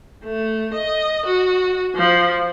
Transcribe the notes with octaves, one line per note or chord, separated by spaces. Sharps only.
A3
D#5
F#4
F3